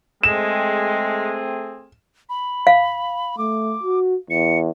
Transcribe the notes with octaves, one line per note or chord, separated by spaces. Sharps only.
G#3 A3 C4 G#4 E7
B5
F5
A3 D6
F#4
E2 C#7